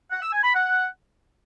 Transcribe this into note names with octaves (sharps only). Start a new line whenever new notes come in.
F#5
E6
G#5
B5
F#5